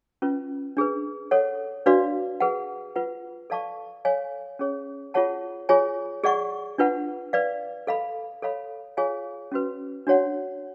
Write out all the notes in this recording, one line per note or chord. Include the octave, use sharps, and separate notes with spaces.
C#4 F4 B4
D4 G#4 B4
A4 C#5 F#5
D4 F#4 B4 D5 F5
G#4 B4 F#5
F4 B4 F#5
A4 D5 F5 A5 C#6
A4 C#5 F5 G#5
C#4 G#4 C#5
F4 G#4 C#5 F#5 A5
F4 G#4 C#5 G#5
G#4 D5 F#5 C#6
D4 F4 B4 F#5
B4 D5 F5
A4 F5 B5
A4 C#5 F5 B5
F4 G#4 C#5 F5 G#5
C#4 F#4 B4
D4 F#4 C#5 F#5